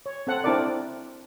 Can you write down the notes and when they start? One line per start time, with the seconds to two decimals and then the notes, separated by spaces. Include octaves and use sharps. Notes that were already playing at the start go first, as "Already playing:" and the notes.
0.06 C#5
0.27 C4 A4 F#5
0.44 C4 D4 E4 A4 A#4 D5